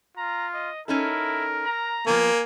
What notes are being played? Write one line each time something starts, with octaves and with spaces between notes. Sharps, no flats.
F4 A#5
D#5
C#4 D#4 E4 A4 A#4
A#5
F3 A#3 B3 G#5